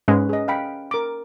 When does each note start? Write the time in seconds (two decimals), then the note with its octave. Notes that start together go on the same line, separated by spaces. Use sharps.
0.08 G#2 G#3 C#4 B4
0.29 G#4 D#5
0.48 F5 G5 B5
0.91 A#4 D6